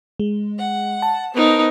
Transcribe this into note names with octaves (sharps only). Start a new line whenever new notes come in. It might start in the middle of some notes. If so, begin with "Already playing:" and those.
G#3
F#5
A5
B3 D#4 A#4 C5